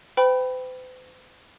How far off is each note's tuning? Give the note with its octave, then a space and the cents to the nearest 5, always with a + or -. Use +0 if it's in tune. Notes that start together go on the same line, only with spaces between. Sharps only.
C5 -45 G5 +0 B5 +0